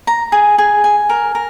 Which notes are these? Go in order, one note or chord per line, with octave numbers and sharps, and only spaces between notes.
A#5
G#4
G#4
G#5
A#4
A#4